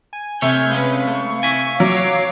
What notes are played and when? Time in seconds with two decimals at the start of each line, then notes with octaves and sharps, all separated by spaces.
0.13 G#5
0.42 C3 A3 C#5 F6 G6 G#6
0.71 G#3 C#4 B4 F5
1.07 A3 C#6
1.43 E5 G#5
1.80 F#3 C#5 D6 C7